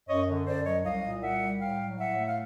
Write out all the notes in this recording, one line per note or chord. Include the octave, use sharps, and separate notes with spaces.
F#2 C#5 D#5
D3
F#2 C5 D5
F#3 C#5 D#5
C2 D#5 F5
A#2
C2 E5 F#5
G3
A2 F5 G5
F#3
A2 E5 F#5
A3
F5